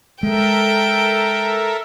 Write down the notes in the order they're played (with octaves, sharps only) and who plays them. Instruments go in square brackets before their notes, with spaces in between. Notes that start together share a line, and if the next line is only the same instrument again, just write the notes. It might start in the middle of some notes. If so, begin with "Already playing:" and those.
[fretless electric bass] G#3 [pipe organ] A4 A#4 E5 [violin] G5